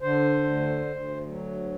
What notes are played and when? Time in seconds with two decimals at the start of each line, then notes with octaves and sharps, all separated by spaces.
0.01 D3 C5
0.44 D2
0.85 D2
1.27 F#3